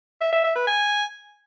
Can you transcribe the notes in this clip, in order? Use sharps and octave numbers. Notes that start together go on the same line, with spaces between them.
E5
E5
E5
B4
G#5